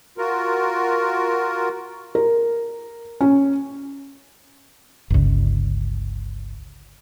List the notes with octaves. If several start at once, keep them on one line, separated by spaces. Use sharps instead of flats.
F4 F#4 A#4
A#4
C#4
G1 C#2